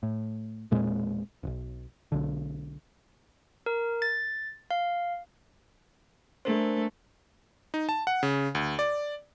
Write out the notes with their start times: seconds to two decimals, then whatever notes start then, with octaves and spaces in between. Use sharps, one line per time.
0.03 A2
0.71 E1 A#2 G#3 C4
1.43 D#1 B1
2.12 B1 D3
3.66 A#4
4.02 A6
4.71 F5
6.45 A3 D4 A#4 C5
7.74 D#4
7.89 A5
8.07 F#5
8.23 C#3
8.55 D2
8.79 D5